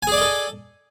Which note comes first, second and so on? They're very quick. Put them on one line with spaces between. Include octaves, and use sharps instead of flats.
G#5 G#4 D5 D#5 A4